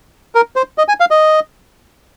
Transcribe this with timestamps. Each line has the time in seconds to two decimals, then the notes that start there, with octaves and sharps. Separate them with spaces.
0.35 A#4
0.56 C5
0.78 D#5
0.88 G#5
1.00 F5
1.11 D#5